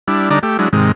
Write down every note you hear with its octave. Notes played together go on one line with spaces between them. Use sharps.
G3 D4 E4
D3 G3 D4 D#4 D5 A#5
A3 G4
F#3 G#3 D4 E4
G#2 C3 D#3 G#3